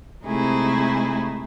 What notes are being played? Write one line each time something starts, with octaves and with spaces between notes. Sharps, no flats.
C3 G#3 A3 D#4 E4 G#4